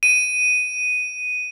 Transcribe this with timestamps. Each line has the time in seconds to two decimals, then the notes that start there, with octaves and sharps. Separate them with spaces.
0.03 D#7